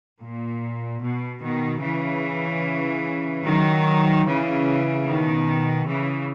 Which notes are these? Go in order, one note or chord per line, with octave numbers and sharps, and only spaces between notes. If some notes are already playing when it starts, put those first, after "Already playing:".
A#2
B2
B2 D#3
C#3 E3
D#3 F#3
C#3 E3
B2 D#3
C#3 E3